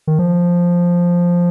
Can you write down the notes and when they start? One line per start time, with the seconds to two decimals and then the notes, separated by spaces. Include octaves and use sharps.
0.07 D#3
0.19 F3